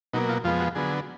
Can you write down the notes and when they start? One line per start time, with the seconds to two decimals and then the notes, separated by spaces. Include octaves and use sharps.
0.13 B2 F#3 A#3 D#4
0.29 F4
0.44 F2 F3 G#3 B3 F4
0.60 F#4
0.75 D3 F#3 B3 G#4